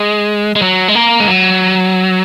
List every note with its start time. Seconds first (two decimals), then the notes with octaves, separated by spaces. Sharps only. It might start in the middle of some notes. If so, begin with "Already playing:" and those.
Already playing: G#3
0.56 G#3
0.62 F#3
0.88 G#3
0.95 A#3
1.20 G#3
1.28 F#3